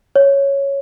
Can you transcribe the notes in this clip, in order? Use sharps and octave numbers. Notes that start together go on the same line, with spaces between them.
C#5